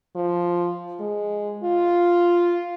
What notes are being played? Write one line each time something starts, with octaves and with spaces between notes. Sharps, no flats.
F3
G#3
F4